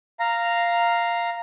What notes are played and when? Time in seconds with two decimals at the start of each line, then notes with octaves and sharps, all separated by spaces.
0.20 F5 A#5